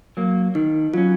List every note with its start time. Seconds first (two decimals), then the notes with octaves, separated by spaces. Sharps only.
0.17 F#3 A#3
0.55 D#3 D#4
0.94 F#3 C#4 F4